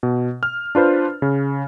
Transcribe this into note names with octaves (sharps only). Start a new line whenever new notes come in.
B2
F6
D4 F4 B4 C5
C#3